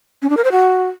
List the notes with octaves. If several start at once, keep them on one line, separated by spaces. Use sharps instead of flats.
C#4
D4
A#4
C5
F#4